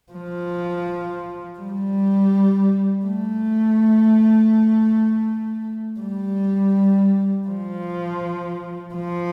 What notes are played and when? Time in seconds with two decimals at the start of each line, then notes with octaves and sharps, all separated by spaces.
0.12 F3
1.59 G3
3.06 A3
6.00 G3
7.47 F3
8.94 F3